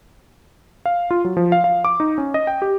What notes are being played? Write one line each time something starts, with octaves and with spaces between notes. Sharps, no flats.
F5
F4
F#3
F3
F5
F5
D6
D#4
C#4
D#5
G5
G4